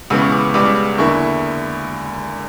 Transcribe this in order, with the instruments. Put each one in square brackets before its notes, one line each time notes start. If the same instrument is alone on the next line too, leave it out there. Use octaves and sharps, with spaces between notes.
[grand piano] C#2 C#3 E3 B3 E6
C#6
D6
C#2 C#3 G3 B3 D6
E2 D3 A#3 E4 C#6